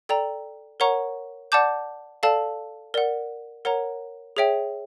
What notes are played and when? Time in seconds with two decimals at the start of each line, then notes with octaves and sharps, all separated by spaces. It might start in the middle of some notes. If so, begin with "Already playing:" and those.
0.09 A4 D5 G5 A#5
0.80 A#4 C#5 F#5 A#5 C#6
1.52 D5 F#5 A5 D6 G6
2.23 A4 D5 F5 A5
2.94 A#4 D5 F#5
3.65 A#4 C#5 F#5 A#5
4.37 G#4 C#5 E5 G5